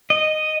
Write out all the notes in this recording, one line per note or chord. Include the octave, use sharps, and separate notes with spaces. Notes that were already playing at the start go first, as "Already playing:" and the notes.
D#5